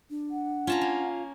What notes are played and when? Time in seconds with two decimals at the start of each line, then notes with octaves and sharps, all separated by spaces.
0.10 D4
0.31 F#5
0.67 C#4 F4 A5 A#5
0.81 A#3